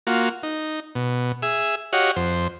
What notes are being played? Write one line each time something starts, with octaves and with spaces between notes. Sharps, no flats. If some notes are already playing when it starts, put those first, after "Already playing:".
A#3 F4 F#4
D#4
B2
G#4 E5 E6
F#4 G4 C#5 D#5 F5 F#5
F2 C5